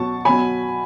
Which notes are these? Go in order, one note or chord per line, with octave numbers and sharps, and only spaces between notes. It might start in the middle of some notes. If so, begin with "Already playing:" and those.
Already playing: B2 F#3 A5 C#6
B2 F#3 G#5 B5